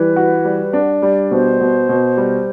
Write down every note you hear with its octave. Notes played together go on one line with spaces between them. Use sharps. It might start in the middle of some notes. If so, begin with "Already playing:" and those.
Already playing: E3 G3 B4
F#4
G3
D4
G3
B2 C5
B2
B2
G3